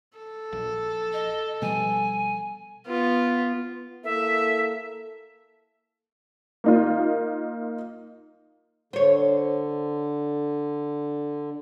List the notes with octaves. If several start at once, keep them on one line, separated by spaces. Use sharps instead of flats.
A4
A#1
D#5
B2 F3 G3 G#5
B3 F4
A#3 E4 A4 E5
A#3 D#4 F4
D3 C5 C#5